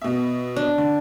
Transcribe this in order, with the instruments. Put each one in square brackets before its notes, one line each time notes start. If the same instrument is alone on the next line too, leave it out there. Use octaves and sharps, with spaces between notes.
[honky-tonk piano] B2 E5
[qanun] D4
[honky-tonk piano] D3